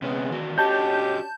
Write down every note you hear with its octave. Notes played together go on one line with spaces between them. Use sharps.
C3 G#3 B3 C#4
E2 D#3 F#4
C#4 D4 F#4 G4 C#5 D#5 A5 G6